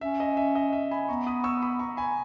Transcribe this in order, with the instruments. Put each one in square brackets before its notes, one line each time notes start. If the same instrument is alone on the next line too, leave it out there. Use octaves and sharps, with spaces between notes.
[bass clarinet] C#4 [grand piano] E5
[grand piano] D#5
E5
D#5
E5
G#5 B5
[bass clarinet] B3 [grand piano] A#5 C#6
[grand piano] B5 D#6
C#6 E6
B5 D#6
A#5 C#6
G#5 B5